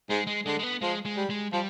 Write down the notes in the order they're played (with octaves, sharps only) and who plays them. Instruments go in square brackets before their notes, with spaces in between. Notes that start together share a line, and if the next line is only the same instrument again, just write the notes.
[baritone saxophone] G#2 [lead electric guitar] G#3
[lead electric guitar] G#3
[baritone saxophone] D3 [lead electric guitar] G#3
[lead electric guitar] G#3
B3
[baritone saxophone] F3 [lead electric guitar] G#3
[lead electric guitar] G#3
[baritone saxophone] G3
[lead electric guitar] G#3
[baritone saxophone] F3 [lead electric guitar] G3